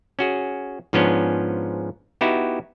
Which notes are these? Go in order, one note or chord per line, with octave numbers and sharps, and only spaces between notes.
C#4 F#4 G#4
G#2 F3 B3 C#4 D4
B3 D#4 E4 F#4 G4